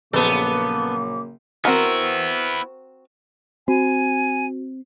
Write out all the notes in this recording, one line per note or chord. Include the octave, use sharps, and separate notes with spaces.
A#1 C#3 F#3 A#3 B3 A4 D6
B3 C4 E4 F#4 A#4
C4 F#4 G#5